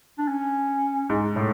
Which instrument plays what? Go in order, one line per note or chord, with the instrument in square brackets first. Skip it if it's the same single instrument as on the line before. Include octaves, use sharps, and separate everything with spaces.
[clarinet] D4
C#4
[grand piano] G#2
A2